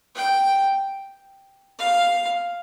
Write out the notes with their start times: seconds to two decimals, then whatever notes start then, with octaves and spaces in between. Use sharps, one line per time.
0.15 G5
1.78 F5